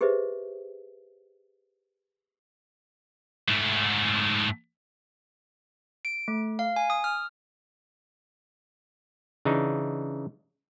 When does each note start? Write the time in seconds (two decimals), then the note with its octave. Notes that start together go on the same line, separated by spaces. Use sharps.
0.01 G4 G#4 B4 C5 D#5 E5
3.48 G#2 A3
6.05 D7
6.28 A3
6.59 F5
6.76 G#5
6.90 D#6
7.04 F6
9.45 C#3 E3 D4 D#4